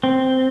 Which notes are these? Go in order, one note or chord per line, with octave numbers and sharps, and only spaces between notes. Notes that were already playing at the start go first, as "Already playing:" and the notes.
C4